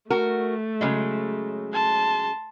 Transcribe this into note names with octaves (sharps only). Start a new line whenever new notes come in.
A3 F#4 A#4
C#3 F#3 G#3
A5 C6